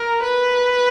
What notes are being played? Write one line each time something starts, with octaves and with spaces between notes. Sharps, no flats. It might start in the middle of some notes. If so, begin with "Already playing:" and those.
Already playing: A#4
B4